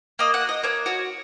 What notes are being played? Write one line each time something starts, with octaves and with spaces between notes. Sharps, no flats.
A#3 D#5
F#5
F#4
D#5
A#3 C#5
F#4 C#5